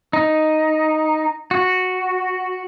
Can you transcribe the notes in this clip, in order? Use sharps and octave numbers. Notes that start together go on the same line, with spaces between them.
D#4
F#4